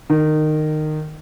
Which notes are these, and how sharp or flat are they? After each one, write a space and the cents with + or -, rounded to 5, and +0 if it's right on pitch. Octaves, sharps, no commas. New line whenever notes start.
D#3 -20